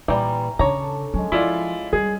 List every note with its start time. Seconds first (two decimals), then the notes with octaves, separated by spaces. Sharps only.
0.08 A#2 E3 G3 G#5 A#5 C#6
0.59 C#3 D4 A4 C#5 A#5
1.14 F#3 G#3 C#4
1.32 F3 E4 F4 D5
1.93 G3 G#4